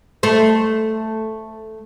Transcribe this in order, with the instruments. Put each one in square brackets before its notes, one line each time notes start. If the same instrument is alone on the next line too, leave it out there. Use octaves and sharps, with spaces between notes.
[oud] A3 C5